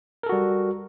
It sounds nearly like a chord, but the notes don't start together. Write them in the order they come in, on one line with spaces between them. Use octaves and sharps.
A#4 A4 F#4 G3